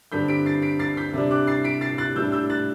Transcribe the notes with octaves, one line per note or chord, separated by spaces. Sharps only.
G2 D3 G3 C4 G6 B6
B6 D7
A6 C7
B6 D7
A6 C7
G6 B6
C3 G3 D4
D6 F#6
A6 C7
B6 D7
A6 C7
F#6 A6
A2 G3 D4 E6 G6
E6 G6
F#6 A6